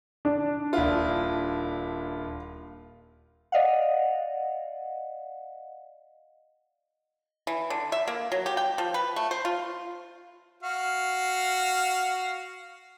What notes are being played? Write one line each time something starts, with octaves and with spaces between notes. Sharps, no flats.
D4
D#1 E4 F4
D5 D#5 F5 F#5
E3
D3
E5
A#3
F#3
G4
G5
F3
B4
A3
C5
F4
F#4 F5